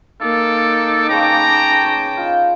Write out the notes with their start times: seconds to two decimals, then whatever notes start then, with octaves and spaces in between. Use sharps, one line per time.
0.21 A#3 D#4 A4 F5 D6
1.09 C#3 B4 C#5 G5 A5 A#5
1.86 C#5
2.17 D#4 F4